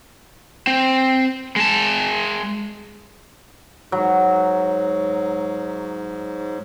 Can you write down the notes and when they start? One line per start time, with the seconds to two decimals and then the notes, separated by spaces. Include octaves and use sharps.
0.67 C4
1.56 G#3 A5
3.92 G#2 F#3